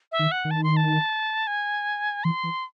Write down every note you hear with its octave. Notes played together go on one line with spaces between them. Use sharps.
E5
D#3
F#5
D#3
A5
C6
A5
G#5
E3 C6
E3